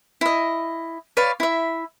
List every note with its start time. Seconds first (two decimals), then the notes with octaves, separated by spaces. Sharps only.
0.21 E4 D#5
1.17 B4 C#5 D5 F5
1.40 E4 E5